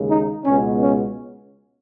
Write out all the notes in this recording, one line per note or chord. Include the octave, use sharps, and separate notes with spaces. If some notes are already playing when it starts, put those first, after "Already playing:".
Already playing: D#2 C#3 G#3
D#4
C#2 B2 G#3 B3 C#4
C#4